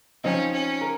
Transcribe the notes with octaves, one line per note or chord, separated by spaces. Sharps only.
F3 C4 C#4 D#4
C#4
A#4